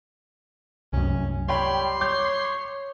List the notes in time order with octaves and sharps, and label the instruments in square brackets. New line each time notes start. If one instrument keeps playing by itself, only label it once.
[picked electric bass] C2 F#2 [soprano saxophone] C#4
[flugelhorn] G3 [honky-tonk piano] C#5 G5 B5 [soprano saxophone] C6
[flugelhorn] C#5 [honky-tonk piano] D6 G6